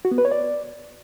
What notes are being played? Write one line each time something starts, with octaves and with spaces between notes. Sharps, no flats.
F#4
B3
B4
C#5
D5